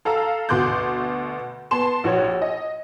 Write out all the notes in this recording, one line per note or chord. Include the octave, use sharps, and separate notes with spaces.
A4 F5 A#5 E6
D2 B2 C6 D6 F#6 G6
B3 A5 C6 E7
A#1 F#4 C#5
D#5